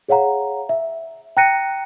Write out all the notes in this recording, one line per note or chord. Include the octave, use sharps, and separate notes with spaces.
G#4 C#5 F5 F#5 A#5
E5
G5 A#5 F#6 A#6 C#7 D#7